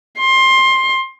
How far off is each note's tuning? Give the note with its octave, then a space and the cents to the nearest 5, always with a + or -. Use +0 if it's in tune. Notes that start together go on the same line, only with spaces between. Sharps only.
C6 +20